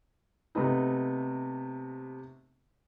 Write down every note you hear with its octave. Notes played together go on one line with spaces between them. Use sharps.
C3 A3 B3 D#4